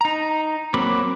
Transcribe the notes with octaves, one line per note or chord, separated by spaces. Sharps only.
D#4 A#5
F#3 A#3 C4 B5 D6